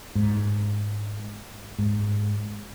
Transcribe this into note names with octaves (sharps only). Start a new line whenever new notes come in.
G#2
G#2